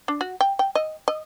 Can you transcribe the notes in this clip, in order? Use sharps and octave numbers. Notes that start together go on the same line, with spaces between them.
D4
F#4
G5
G5
D#5
D#5